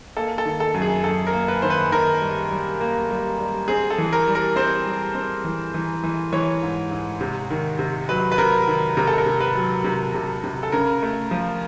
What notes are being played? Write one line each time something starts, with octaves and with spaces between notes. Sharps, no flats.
A#3 A4
A4
D#3
A4
F#2
G#4
F#2 A4
A#4
A#3
B4
D#3 C5
B4
D#3 A#4
G3
G3
A#3
G3
G3
C4 G#4
A4
E3
A#4
G3
A#4
C4 C5
G3
C4
E3
E3
E3
E3 C#5
G#2
G#2
C3
D#3
C3
F#3 B4
B4
C3 A#4
D#3
C3 A#4
A4
A#4
C3
B4
F#3
C3
C3
C3
A4
C#3 A#4
A3
F3